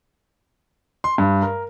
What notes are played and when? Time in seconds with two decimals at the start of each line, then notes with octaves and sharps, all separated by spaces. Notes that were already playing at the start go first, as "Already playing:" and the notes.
1.04 C6
1.18 G2
1.42 A#4